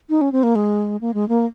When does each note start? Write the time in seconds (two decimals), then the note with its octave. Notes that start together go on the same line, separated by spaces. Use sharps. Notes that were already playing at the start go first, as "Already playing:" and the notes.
0.10 D#4
0.21 C#4
0.32 C4
0.43 A#3
0.55 G#3
1.01 A#3
1.14 G#3
1.29 A#3